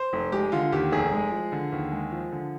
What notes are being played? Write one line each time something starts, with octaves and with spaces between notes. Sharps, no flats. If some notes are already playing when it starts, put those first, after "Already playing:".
Already playing: C5
F1
G#3 G4
D3 F4
D#2 G4
F1 G#4
G#3
F3
D3
D#2
G#3
F3
D3